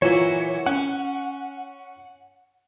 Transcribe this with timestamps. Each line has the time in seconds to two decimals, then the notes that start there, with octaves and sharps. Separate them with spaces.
0.02 A#2 E3 F#3 C#5
0.66 C#4 F#5